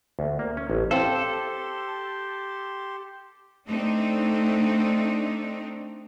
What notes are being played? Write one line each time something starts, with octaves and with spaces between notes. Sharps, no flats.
D2
A#3
C#4
A1
C4 G4 A4 C5 F5 C6
A3 C4 D4 D#4